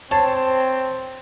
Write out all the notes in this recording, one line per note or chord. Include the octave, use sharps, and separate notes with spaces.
C4 C5 C#5 A5